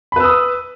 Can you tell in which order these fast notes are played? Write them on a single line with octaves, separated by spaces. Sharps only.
B5 B4 E6 D#6